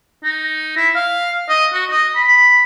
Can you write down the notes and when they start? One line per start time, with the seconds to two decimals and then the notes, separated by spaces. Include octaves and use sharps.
0.23 D#4
0.77 E4
0.95 F5
1.49 D#5
1.73 F#4
1.90 D#5
2.16 B5